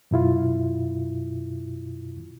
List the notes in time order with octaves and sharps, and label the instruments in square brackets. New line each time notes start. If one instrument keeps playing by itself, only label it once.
[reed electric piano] F#2 B2 E4 F4